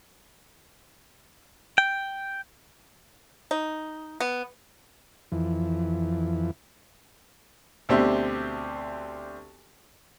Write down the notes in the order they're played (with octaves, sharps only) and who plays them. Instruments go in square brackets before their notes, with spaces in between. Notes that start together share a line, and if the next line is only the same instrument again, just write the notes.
[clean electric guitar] G5
[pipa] D#4
B3
[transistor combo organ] F2 E3
[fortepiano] D2 B2 C4 D4 G4 E5